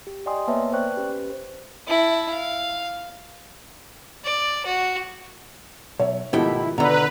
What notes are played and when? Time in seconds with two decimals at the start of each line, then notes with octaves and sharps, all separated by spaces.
0.07 G4
0.26 D5 D#5 G5 G#5 C6 D#6
0.47 A#3 B3 B4 C#5 E5 A5
0.72 B4 C5 D5 G5 C#6 F#6
0.94 C#4 G4 B4 C5
1.87 E4 A5
2.30 F5
4.24 D5
4.66 F#4
6.00 B1 C#5 E5
6.33 G#2 B2 D#3 F3 A3 E4 G4
6.78 B2 D3 B4 A#5